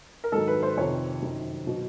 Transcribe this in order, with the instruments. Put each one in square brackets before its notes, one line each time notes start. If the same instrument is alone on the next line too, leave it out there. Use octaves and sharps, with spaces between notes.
[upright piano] A#4
G#2 D#3 F#3 A4
B4
C5
F2 C3 D#3 C#5
F#2 D#3 F#3
B2 F#3